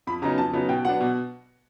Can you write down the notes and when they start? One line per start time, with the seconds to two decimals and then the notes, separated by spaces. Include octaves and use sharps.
0.07 F2 B5
0.22 C#3 F#3 B3 D#4 A#5
0.38 F2 A5
0.53 C#3 F#3 B3 D#4
0.69 B2 G5
0.85 F#3 B3 D4 F#5
1.00 B2